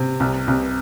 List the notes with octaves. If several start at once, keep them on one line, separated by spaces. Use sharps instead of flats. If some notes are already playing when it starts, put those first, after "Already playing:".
Already playing: C3
C2
C2